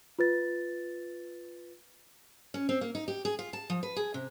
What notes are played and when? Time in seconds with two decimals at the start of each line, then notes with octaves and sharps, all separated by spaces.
0.19 F4 B4 A6
2.54 C#4
2.69 C4
2.81 A#3
2.95 D#4
3.08 G4
3.25 G#4
3.39 F4
3.53 A5
3.70 F3
3.83 B4
3.96 G#4
4.14 C3